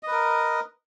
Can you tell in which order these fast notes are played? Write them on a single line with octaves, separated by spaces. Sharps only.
D#5 B4 A#4